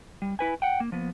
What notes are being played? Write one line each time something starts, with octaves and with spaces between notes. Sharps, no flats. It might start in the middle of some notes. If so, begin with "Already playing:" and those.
G3
E4 B4 G#5
F#5 G5
A#3
F3 A#3 B3